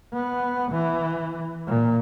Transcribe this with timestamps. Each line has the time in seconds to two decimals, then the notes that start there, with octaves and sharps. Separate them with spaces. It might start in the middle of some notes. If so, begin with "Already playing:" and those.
0.13 B3
0.71 E3
1.67 A#2